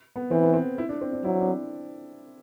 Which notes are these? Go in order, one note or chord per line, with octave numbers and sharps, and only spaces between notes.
B3
E3 C4
B3
C4
E4
D4
C4
D4
F#3 E4
D4
C4